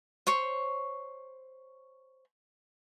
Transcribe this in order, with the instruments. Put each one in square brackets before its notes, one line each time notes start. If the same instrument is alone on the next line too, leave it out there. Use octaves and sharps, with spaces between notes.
[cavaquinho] C5 C#5 C#6